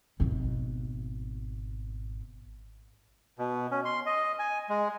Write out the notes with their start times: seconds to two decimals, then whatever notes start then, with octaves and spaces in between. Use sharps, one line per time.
0.20 G#1 B2
3.39 B2
3.71 C#4
3.85 C6
4.06 D#5
4.39 G#5
4.69 G#3